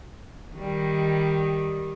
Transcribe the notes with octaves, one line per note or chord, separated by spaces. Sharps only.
D#3 G3